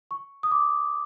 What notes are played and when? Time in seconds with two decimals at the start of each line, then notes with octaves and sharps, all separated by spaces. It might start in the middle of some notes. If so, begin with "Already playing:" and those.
0.11 C#6
0.43 D#6
0.51 D6